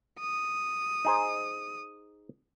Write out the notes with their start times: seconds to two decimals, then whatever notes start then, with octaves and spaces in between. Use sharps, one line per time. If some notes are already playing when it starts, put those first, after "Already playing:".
0.20 D#6
1.05 D#4 G#4 C5